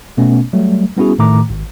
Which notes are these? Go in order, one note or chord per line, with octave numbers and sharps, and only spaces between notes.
B2 A3 B3 C#4
F#3 G3 A3
G3 B3 C#4 E4 F#4 G#4
A2 D#3 A3 A#5 D6
G#1